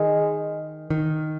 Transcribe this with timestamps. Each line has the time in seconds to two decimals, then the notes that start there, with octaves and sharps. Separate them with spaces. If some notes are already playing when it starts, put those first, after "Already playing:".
Already playing: D#3 G#3
0.90 D#3